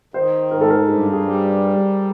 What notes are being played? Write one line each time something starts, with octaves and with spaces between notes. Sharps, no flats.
D#3 C5
G#2 A#4
A4
A#4
G2 G#4
G#4
G3